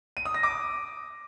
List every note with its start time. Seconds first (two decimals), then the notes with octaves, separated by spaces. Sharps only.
0.17 D#7
0.25 D#6
0.34 A#6
0.43 D6